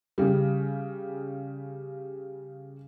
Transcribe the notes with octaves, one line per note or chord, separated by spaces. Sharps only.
C#3 G3